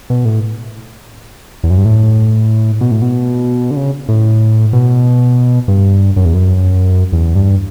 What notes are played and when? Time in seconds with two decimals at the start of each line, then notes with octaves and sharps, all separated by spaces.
0.10 B2
0.25 A2
1.63 E2
1.70 F#2
1.78 G2
1.85 A2
2.81 B2
2.91 A2
3.02 B2
3.71 D3
3.76 C#3
4.09 A2
4.73 B2
5.68 G2
6.16 F#2
6.25 E2
6.34 F#2
7.12 E2
7.35 G2